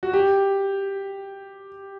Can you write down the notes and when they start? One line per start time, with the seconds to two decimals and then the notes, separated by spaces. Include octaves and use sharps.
0.03 F#4
0.13 G4